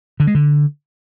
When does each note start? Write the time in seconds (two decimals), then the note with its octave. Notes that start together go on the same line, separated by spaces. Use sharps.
0.20 D3
0.27 G#3
0.35 D3